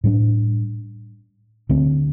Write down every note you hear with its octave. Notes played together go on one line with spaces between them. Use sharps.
A2 G3 D4
D2 D3 A3 C4